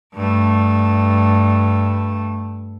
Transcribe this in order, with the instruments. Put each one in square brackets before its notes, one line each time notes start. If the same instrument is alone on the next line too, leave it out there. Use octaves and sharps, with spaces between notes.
[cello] G2 A3